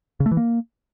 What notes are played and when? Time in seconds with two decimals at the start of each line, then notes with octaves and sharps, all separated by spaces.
0.20 C#3
0.26 A3
0.31 E3
0.37 A#3